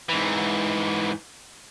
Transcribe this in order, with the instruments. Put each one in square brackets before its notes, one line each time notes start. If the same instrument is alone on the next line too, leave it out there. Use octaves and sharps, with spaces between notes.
[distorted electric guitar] G#2 E3